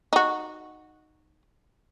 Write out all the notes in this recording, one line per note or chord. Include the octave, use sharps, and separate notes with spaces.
D#4 F#4